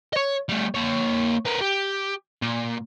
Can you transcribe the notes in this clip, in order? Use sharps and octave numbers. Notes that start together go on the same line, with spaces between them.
C#5 D#5
G3 A3
A#3 C#5
B3 A#4
G4
A#2